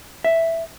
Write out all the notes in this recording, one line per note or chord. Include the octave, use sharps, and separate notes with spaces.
E5